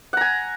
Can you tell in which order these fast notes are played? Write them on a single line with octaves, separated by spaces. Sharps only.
F#5 A#5 G#5